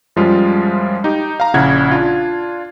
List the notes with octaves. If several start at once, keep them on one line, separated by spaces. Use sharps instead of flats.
F#2 F3 G3 G#3 F4
D#4 G4
F5 A#5
A#1 C#3 E4 F#5 G#6
D4 F4